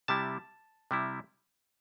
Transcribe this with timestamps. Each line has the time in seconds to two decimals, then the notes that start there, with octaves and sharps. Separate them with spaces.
0.08 C3 G3 E4 A5
0.91 C3 G3 E4